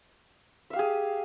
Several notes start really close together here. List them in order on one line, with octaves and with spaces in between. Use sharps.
E5 F5 G4 G#4